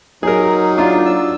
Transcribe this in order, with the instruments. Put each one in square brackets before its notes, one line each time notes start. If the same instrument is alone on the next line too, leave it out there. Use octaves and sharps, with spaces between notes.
[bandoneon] F#3 D#4 [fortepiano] G#4 A#4
[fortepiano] D4 F4
[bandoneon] E6